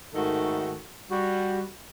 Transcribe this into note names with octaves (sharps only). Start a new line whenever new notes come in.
G#2 D#3 A3 F#4 A4
G3 F#4